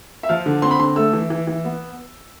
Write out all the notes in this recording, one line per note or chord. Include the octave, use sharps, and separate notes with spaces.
E5
F3 F5
D3
C4 C6
B5
D3 C6
A3 E6
E3
E3
E3
B3